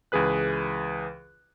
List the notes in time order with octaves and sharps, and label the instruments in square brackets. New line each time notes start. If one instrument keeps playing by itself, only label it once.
[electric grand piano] C#2 E3 G#4 B4 F#6